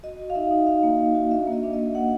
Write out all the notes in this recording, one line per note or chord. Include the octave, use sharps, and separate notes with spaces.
F#4 D#5
F#4
F5
D#4 E5
D#4
D#4 F5
A#3
A#3
F#4
D4 E5
A#3
D#5
D4
D#5
A#3
A#3 F#5